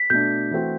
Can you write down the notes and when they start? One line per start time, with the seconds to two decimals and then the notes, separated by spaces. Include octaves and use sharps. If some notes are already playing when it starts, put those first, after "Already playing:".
Already playing: B6
0.10 B2 A3 D4 G6
0.51 E3 A3 C4 F#4